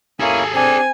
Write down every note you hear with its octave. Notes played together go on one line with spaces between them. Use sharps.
A#3 C#4 E4 G#4 A4 G#5
C4 D4 G#5